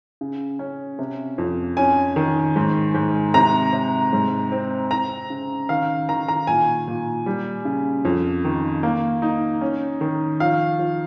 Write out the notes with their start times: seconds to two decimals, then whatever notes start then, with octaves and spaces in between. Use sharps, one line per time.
0.21 C#3
0.59 C#4
0.99 C3
1.38 F2
1.77 C#4 G#5
2.16 D#3
2.56 G#2
2.95 G#2
3.34 C3 A#5
3.73 C3
4.13 G#2
4.52 C4
4.91 C4 A#5
5.30 C#3
5.69 D#3 F5
6.09 D#3 A#5
6.28 A#5
6.47 A#2 G#5
6.88 A#2
7.26 G3
7.65 C#3
8.05 F2
8.45 D#3
8.83 A#3
9.22 D#4
9.61 C#4
10.01 D#3
10.40 F3 F5
10.79 F3